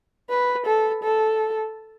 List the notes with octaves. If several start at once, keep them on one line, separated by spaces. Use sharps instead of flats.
B4
A4
A4